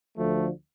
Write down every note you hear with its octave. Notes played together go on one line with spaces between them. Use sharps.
D2 D3 F3 A3